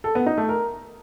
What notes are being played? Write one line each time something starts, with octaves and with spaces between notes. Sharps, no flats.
A4
B3
D#4
A3
A#4